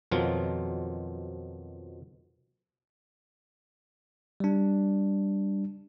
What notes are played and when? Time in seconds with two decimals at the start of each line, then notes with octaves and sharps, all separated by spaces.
0.11 F2 B2 D#3 F3 F#3 F4
4.40 G3 D4